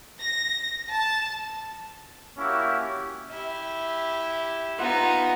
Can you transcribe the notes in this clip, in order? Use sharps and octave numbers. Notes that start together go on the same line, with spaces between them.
A#6
A5
A#3 C#4 E4 F#4 G4
E4 G4
B3 D#4 F4 F#5